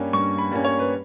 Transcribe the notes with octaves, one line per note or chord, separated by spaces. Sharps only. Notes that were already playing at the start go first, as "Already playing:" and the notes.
Already playing: G2 G3 A#3 C#4
G2 C#6
B5
G3 A#3 C#4
C#5
B4